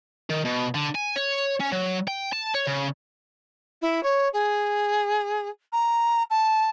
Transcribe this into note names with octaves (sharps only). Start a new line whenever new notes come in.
D#3
B2
D3
G#5
C#5
C#4
F#3
G5
A5
C#5
C#3
E4
C#5
G#4
A#5
A5